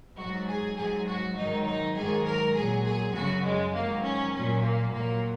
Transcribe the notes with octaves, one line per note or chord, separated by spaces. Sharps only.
G#2 F#3 F#4
G#4
G#2 F#3 G#4
F#4
G#2 D#3 F#3 D#4
D#4
G#2 D#3 F#3 G#4
A#4
A#2 F#3 G#4
G#4
F#2 C#3 F#3 F#4
G#3
G#2 D#3 F#3 A#3
C#4
A#2 F#3 C#4
A#3
A#2 F#3 A#3